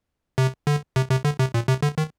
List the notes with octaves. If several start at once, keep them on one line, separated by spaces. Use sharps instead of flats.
C3
D3
C3
C3
D3
C3
A#2
C3
D3
D#3